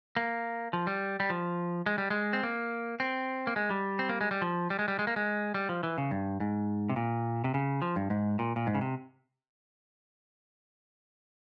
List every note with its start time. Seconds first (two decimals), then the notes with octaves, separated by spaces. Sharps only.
0.17 A#3
0.73 F3
0.87 G3
1.20 G3
1.30 F3
1.86 G#3
1.98 G3
2.10 G#3
2.33 C4
2.43 A#3
3.00 C4
3.47 A#3
3.56 G#3
3.70 G3
3.99 C4
4.09 A#3
4.21 G#3
4.31 G3
4.42 F3
4.70 G3
4.79 G#3
4.88 G3
4.99 G#3
5.07 A#3
5.16 G#3
5.54 G3
5.69 F3
5.83 E3
5.98 C#3
6.11 G2
6.40 G#2
6.89 C3
6.96 A#2
7.44 C3
7.54 C#3
7.82 F3
7.96 G2
8.10 G#2
8.39 A#2
8.56 A#2
8.67 G#2
8.75 C#3
8.81 C3